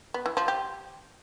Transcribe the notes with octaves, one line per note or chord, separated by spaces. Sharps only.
B3
E3
F3
G4